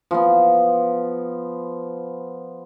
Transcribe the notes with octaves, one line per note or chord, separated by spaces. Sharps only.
F3 B3